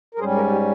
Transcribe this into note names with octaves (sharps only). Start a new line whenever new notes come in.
A#4
G#2 G3 C#4 G#4 C5
G4 A#4
D#4 G4